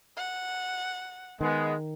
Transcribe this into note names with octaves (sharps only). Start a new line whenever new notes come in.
F#5
D#3 G#3 B3